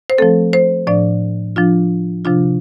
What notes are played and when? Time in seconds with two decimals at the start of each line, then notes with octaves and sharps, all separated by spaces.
0.10 C5
0.18 F3 A3 C4 A4
0.53 C5
0.87 A2 F3 D4 D5
1.56 F3 D4 F4
2.25 C3 F3 D4 F4